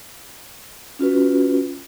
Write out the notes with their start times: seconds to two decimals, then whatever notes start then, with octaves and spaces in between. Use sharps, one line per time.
0.99 C#4 F4 F#4 B4